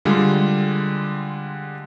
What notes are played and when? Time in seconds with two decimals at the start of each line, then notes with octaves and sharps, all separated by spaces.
0.05 D3 G3 G#3 F4